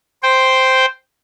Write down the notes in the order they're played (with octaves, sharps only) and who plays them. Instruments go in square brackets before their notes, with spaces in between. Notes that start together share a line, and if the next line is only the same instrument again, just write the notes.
[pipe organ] C5 G5